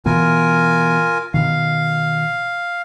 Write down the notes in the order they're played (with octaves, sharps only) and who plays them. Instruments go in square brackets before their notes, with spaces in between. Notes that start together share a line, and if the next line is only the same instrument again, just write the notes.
[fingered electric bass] B2 E3 B3 [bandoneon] F4 A#4 G#5
[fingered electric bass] B2 D#3 [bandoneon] F5